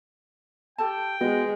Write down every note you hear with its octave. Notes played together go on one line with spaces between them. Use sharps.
G4 A4 G5 A5
G#3 B3 F#4 D#5